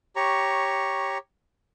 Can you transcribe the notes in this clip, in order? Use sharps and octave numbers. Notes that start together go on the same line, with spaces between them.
G4 C#5 A#5 C#6